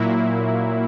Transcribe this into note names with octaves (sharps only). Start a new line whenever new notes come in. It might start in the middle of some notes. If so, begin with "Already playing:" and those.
Already playing: A#2 F#3 A#3 E4